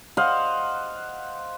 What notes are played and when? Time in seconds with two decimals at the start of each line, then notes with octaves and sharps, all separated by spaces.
0.17 C5 D#5 F5 F#5